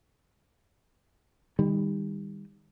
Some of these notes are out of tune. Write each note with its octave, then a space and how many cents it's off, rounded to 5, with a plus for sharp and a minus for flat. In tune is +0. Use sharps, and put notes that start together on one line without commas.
D#3 +0 G3 +30